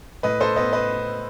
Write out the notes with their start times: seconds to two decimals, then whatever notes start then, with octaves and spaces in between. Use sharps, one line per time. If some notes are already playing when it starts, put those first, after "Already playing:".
0.23 A2 B4 D#5
0.40 A4 C5
0.56 B3 B4 D#5
0.73 B4 D#5